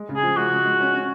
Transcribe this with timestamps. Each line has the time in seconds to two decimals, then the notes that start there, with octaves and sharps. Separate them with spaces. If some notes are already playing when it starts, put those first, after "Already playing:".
Already playing: G#3
0.09 C#3
0.15 G#4
0.23 F3
0.37 G#3 F#4
0.51 C#3
0.65 G#3
0.80 C#4
0.94 C#4